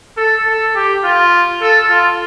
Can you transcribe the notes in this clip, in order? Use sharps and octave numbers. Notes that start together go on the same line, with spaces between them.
A4
A4
G4
F4
A4
F4